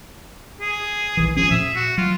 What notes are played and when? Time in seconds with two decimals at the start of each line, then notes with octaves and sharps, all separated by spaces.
0.61 G#4
1.17 A#1 D#3 E3
1.36 F1 F3 C#4 G#4
1.51 A#2 E5
1.75 F#4
1.98 F#3 F4